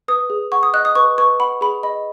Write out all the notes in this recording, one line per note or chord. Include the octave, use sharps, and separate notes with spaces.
B4 D#6
G#4
F#5 C#6
D#6
D#5 F#6
D#6
B4 C#6
B4 C#6
F#5 B5
G#4 B5
D#5 B5